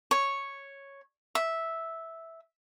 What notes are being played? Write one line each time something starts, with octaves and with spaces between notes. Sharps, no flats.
C#5
E5